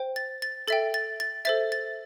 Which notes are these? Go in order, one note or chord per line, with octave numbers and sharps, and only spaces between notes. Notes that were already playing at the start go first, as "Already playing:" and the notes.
Already playing: C5 G5
A6
A6
A4 E5 G5 A6
A6
A6
A4 C5 E5 A6
A6